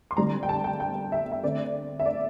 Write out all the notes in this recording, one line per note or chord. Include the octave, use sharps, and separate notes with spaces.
C6
D3 G3 C4 A#5
G5
A5
G5
G5
E5
E5
D3 A3 C4 D5
E5
D5